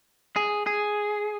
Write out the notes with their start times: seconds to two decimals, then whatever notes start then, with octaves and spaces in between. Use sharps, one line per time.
0.36 G#4
0.66 G#4